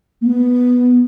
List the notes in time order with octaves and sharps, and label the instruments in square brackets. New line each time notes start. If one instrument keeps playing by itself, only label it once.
[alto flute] A#3
B3